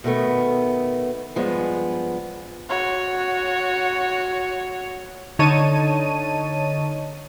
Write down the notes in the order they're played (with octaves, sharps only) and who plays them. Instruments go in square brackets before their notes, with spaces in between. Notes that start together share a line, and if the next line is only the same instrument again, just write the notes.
[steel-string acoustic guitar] B2 D#3 A3 B3
G2 F3 G#3 B3
[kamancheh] F#4 C#5
[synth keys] D3 D#4 C#5 D#5 A5 D#7